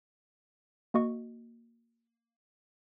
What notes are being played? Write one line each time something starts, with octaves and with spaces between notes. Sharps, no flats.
A#3 F#4 D#5 C#6